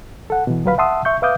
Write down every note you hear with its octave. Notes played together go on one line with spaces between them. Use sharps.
A4 F#5
B2 E3
D2 F#3 G3 B4 F5 B5
E5 F#5 A5 C6 D#6 E6
E5 C#6 G6
B4 E5 F5 D6 D#6 G6